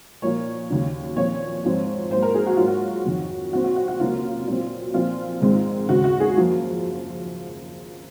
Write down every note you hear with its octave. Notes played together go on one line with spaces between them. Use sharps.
A#2 F3 A#3 C#5
D#2 C#3 F#3
A#2 F3 C4 C#5
G#2 F3 C4
G#2 F#3 A#3 C5
A#4
G#4
F#4
G#2 F#3 A#3 F4
F#4
F2 D#3 F#3
A#2 F#3 C4 F#4
F#4
F#4
F#4
C#2 C3 F#3 A#3 F4
A#2 F#3 C4
A#2 F3 C4 F4
G#2 D#3 G#3 C4
D#2 C#3 G#3 F#4
F#4
G#4
F#2 F3 A#3